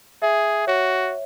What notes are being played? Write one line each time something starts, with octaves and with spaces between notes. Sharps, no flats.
G#4 E5
F#4 C#5